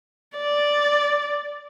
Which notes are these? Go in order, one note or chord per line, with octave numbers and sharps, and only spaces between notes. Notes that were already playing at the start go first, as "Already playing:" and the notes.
D5